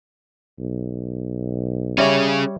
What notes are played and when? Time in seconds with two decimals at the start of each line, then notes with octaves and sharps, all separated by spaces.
0.59 B1
1.98 G3 C#4 G#4 C#5 D5 E5